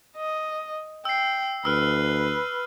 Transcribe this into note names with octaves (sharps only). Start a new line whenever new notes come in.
D#5
G5 E6 C7
D2 B4 E6 F6